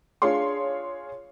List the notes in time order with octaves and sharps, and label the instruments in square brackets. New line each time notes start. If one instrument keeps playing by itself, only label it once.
[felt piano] D4 F4 G#4 C#5 F5 C6